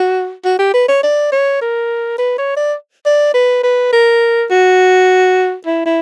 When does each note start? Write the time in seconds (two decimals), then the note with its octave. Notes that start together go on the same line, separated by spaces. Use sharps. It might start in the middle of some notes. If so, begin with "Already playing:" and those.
Already playing: F#4
0.45 F#4
0.59 G4
0.74 B4
0.88 C#5
1.03 D5
1.32 C#5
1.61 A#4
2.18 B4
2.38 C#5
2.56 D5
3.06 D5
3.34 B4
3.63 B4
3.93 A#4
4.51 F#4
5.66 E4
5.86 E4